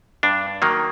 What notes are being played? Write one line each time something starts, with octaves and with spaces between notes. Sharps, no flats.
G2 D4
D#3 F#3 A#3